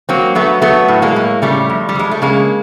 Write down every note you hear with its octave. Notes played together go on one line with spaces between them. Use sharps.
F#3 A#3 C4
F#3 A3 B3
F#3 A3 B3
A2
G#3 A#3
A2
C#3 G3 A3
F2
G3
F2 G#3
A3
C#3 G#3 A#3